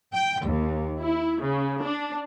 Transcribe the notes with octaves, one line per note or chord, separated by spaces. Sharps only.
G5
D#2
E4
C#3
D4